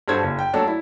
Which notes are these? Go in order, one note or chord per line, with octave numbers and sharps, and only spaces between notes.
G2 F#4 A4 C5 G#6
F#1
G5
F#3 A3 D4 A4 D5
E4